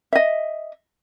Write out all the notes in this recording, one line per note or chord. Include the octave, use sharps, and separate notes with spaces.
D#5 E5